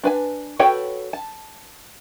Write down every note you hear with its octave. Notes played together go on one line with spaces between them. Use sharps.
D4 B4 G#5
F#4 A4 B4 C#5 G5
A5